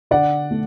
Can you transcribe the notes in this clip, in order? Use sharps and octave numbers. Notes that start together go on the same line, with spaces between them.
D3 D5 F#5
A3